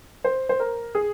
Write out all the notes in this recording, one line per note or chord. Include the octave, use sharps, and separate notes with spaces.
C5
C5
A#4
G#4